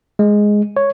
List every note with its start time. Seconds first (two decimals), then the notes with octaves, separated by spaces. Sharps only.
0.19 G#3
0.77 C#5